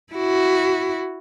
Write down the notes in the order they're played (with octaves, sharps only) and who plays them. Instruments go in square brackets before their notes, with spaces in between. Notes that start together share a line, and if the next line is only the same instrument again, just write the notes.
[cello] E4 F#4